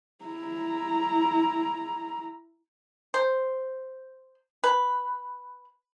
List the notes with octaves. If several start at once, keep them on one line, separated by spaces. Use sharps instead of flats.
E4 A#5
C5
B4